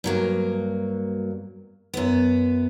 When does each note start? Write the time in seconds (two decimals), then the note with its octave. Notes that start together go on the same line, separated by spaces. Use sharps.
0.04 G2 F#3 A#3
1.94 F#2 B3